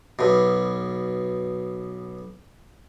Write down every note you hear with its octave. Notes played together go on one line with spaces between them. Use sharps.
B1 B2